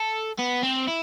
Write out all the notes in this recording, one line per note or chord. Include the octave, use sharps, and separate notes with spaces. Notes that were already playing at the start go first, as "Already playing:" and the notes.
Already playing: A4
B3
C4
E4